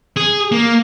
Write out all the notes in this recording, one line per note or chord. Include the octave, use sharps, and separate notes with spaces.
G#4
A#3